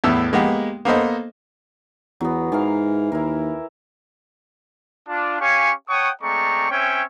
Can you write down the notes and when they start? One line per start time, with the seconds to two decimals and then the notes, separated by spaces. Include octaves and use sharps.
0.04 E2 A2 B3 E6
0.33 G#3 A#3 B3 G4
0.85 A#3 B3 A4 C5 D#5
2.21 E2 F#3 B3
2.52 G#2 E3 A#4 F5
3.12 D#2 E4 A#4
5.07 D4 F4
5.40 C#4 G4 C#5 F5 G#5 C#6
5.89 C#5 F#5 G5 A5 C#6 D#6
6.21 G#3 A3 C4 D5 A#5 C#6
6.70 C4 C#4 C#5 E5 G5 G#5